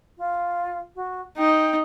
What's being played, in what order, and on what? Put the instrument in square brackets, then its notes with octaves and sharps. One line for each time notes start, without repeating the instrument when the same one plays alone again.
[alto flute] F4
F#4
[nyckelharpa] D#4 [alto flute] G5